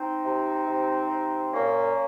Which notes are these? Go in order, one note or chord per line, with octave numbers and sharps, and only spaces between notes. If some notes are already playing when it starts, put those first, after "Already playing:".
Already playing: C4 D#4
C3
C3
C3
A#2 A#3 C#4